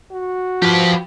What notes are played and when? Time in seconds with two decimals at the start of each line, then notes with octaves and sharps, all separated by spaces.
0.12 F#4
0.62 F3 G4 B4